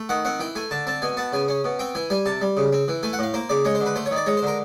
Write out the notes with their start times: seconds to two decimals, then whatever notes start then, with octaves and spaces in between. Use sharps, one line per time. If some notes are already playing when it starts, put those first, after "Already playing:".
Already playing: A3
0.09 D#3 F#5
0.25 C4 F#5
0.40 E3 G5
0.55 A3 G#5
0.71 D3 A5
0.87 C4 A5
1.02 B2 G#5
1.17 B3 A5
1.33 C#3 G#5
1.48 C#4
1.64 B2
1.79 C4 G5
1.95 E3 G#5
2.10 G3 G#5
2.26 C3 A5
2.42 G3
2.57 C#3
2.73 C4
2.88 E3
3.03 A3 G#5
3.13 F#5
3.19 A2 F5
3.34 A#3 C5
3.49 C#3 D5
3.65 G#3 C#5
3.75 C5
3.80 D3
3.86 B4
3.96 A3 C5
4.06 C#5
4.11 D#3 D5
4.26 G#3 C#5
4.37 C5
4.42 D3 A#4